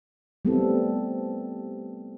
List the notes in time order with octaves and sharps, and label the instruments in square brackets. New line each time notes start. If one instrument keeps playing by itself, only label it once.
[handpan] G3 A3 B3 C4 E4 A4